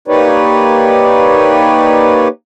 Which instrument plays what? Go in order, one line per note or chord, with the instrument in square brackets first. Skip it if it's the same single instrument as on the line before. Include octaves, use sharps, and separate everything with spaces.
[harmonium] A#3 D#4 G4 B4 C#5 D5